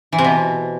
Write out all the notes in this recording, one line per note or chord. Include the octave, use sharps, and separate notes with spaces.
E3
C3
B2